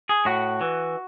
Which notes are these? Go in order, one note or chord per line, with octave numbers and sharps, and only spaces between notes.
G#4
A2 F#4
E3